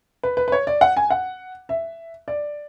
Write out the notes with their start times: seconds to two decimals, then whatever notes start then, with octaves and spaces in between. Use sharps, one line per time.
0.23 B4
0.37 B4
0.48 B4
0.52 C#5
0.67 D5
0.81 F#5
0.97 G#5
1.10 F#5
1.69 E5
2.28 D5